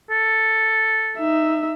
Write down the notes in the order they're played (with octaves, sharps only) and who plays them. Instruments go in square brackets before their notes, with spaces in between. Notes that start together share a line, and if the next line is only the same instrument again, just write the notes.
[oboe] A4
[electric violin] D#4 E5